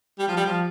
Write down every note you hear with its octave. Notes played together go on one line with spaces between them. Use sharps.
G3
F3
G3
F3